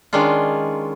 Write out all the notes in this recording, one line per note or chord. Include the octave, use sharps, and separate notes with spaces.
D#3 G#3 C#4 D4 F4